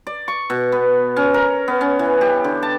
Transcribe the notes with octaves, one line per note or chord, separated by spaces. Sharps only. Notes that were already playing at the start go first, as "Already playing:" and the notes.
D5
C#6
B2
B3
C#4
A#4
B3
C#4
E3
G4
D3
A5